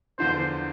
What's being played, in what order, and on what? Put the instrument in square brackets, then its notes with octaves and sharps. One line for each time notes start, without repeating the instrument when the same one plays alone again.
[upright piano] E2 D3 F3 [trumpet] C5